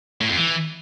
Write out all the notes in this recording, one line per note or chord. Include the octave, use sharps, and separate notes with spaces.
A2
F2
E3